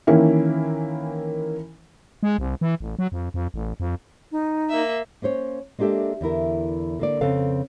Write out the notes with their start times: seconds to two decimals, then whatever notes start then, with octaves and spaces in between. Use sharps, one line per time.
0.07 D#3 E3 A#3 C#4 E4
2.23 G#3
2.38 C2
2.61 E3
2.80 A1
2.99 F#3
3.12 F2
3.34 F2
3.54 A1
3.80 F2
4.32 D#4
4.69 A#3 E5
5.22 A#3 C#4 C5 C#5
5.79 G#3 A#3 D4 G4 A4 E5
6.21 E2 D3 E4 A#4
6.99 D3 A#3 D5
7.21 F2 C#3 C4 A4 B4 F5